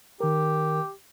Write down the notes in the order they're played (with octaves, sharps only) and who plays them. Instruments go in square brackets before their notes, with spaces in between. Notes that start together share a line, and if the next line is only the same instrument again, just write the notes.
[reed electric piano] D#3 A#4 [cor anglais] G4